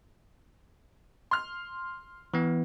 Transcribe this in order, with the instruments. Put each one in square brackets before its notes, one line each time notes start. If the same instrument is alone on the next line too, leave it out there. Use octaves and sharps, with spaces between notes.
[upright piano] C6 F6
[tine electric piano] E3 B3